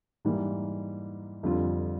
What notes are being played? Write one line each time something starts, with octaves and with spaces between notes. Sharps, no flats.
G#2 E3 G3 A#3
F2 D3 G3 C4 F4